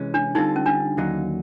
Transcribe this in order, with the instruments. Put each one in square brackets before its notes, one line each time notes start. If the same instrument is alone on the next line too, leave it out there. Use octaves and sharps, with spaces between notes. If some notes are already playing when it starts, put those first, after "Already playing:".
Already playing: [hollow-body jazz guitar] C3 E3 G#3 C#4
[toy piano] D4
[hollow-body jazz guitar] D3 G3 C4 F4 A4 [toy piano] D#4
[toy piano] C#4
D4
[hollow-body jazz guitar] D#2 D3 F#3 A#3 D#4